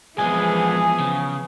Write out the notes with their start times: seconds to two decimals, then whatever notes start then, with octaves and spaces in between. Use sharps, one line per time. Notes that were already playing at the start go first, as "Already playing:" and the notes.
0.18 B1 E3 F3 G#3 B3 G#4 G#5
1.00 C#3